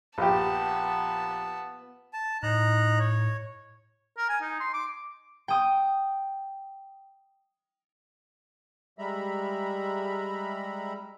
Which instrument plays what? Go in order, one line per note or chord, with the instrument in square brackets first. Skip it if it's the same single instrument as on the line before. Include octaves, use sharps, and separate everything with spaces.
[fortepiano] A#1 G4 [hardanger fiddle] B3 A5
[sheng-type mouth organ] A5
[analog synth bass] A2 [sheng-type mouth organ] D#4 A#5 F#6
[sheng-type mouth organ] C#5
[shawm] A#4
G#5
D#4
C6
D6
[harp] G5 D#6
[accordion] G3 G#3 E5 A#5 B5